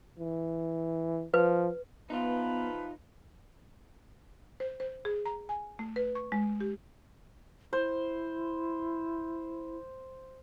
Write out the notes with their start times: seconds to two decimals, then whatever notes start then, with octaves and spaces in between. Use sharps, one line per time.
0.18 E3
1.34 F3 B4
2.10 F3 B3 D#4 F4 B4
4.60 C5
4.80 C5
5.05 G#4
5.26 A#5
5.49 G#5
5.79 A3
5.96 B4
6.15 C#6
6.32 G#3
6.60 G4
7.73 E4 C5